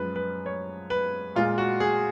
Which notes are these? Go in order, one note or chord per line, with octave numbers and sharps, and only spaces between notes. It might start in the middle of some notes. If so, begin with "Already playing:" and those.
Already playing: F#2 F3 G#3 B4
B4
C#5
B4
A#2 G#3 F4
F#4
G#4